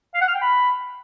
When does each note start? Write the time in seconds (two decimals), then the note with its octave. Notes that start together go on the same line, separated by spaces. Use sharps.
0.14 F5
0.21 F#5
0.28 F6
0.35 G5
0.42 B5